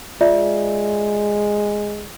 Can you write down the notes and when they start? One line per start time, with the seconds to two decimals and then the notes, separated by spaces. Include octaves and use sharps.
0.21 G#3 F4 D5 E5